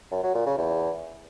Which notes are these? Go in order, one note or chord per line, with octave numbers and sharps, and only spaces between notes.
F#2
F#3
A#2
C#3
E2